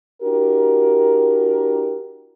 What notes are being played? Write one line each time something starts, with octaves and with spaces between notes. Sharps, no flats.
D4 E4 F#4 G4 A#4